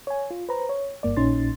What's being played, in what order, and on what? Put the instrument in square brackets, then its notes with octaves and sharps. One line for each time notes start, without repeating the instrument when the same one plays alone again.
[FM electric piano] C#5 G#5
F4
B4 C5 A#5
C#5
G1 G2 A#3 D5
A#1 A#2 C#4 D#4 C6 A6